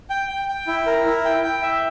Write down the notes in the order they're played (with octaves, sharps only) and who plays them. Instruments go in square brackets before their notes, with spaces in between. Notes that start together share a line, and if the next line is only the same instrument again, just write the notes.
[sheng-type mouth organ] G5
G5
G5
E4
A#4
E4
G5
G5
E5